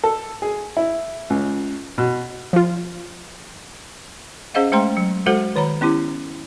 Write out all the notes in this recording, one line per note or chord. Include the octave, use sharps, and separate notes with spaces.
A4
G#4
E4
C#2
B2
F3 F4
C#4 G#4 C5 D#5 F5 F#5
G#3 A3 C5 G5 A#5 C6
F#3
G#3 F#4 A4 C5 F#5
D#3 C#5 A#5 B5
B3 C#4 E4 G4